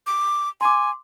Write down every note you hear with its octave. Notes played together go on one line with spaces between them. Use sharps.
D6
G#5 C6 D6